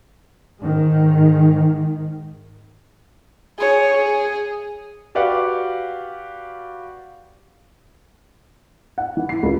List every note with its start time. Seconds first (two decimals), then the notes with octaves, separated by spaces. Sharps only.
0.58 G#2 D#3
3.58 G#4 C#5
3.95 G#4
5.15 F#4 G4 B4 D5 F5 F#5
8.98 F#5
9.17 E3
9.29 C7
9.43 C#2